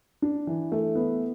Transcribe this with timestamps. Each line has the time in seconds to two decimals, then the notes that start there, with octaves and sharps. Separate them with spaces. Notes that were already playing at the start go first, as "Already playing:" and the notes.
0.22 D4
0.47 E3
0.72 A3
0.95 B3